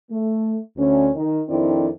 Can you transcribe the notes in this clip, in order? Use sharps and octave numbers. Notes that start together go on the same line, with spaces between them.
A3
D2 C#4
D#3
F2 D#3 C4 D4 E4 D5